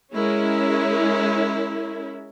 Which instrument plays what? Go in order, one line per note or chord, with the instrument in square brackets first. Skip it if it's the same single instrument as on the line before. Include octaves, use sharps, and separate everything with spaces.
[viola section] G#3 C#4 E4 A#4